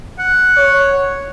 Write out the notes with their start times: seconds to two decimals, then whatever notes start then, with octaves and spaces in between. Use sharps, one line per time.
0.19 F#5
0.57 C#5